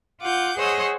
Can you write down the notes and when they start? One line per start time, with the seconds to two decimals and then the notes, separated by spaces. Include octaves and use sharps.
0.20 F4 F#5 D6 G6
0.58 G#4 C5 C#5 D#5 F#5 E6